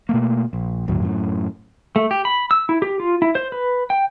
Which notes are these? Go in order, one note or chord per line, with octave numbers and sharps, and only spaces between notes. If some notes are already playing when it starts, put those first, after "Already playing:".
B2 A3 A#3
A#1
G1 D#2 A2 F#3
F#2 A2
A3
G4
B5
E6
E4
G4
F4
E4
C5
B4
G5